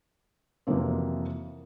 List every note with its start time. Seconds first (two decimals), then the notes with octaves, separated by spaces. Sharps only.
0.67 F2 C3 E3 F#3 A#3 C4